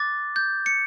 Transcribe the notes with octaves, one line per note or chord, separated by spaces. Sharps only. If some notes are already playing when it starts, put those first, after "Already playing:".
Already playing: D6 F#6 A6
G6
C#7